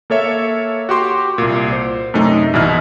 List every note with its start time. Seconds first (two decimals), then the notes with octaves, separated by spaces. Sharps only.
0.10 A#3 A4 C#5 E5
0.89 F#4 G4 C6 D6
1.38 C2 A#2
1.72 C5
2.14 F#2 C3 A3 D#4
2.54 A#1 B2 E3 E4 D#5 F6